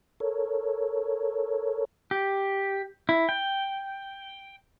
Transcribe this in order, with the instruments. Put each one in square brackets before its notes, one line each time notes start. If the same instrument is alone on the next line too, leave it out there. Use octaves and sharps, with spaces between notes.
[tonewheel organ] A4 A#4 C#5
[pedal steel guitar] G4
E4
G5